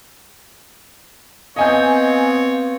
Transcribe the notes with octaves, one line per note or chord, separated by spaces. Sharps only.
B3 C4 C#5 D#5 F5 G#5 G6